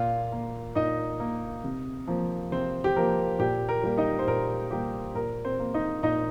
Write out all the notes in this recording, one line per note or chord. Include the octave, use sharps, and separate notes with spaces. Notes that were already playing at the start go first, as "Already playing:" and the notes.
Already playing: A#2 F4 F5
A#3
A#2 D#4 D#5
A#3
C3
F3 A#3
C3 C4 C5
G4
F3 A#3 A#4
A#2 G4
A#4
G3 A#3
D#4 D#5
C5
A#2 A#4
G3 A#3 G4
A#2 A#4
C4 C5
A#3
D#4 D#5
A#2 D#4 D#5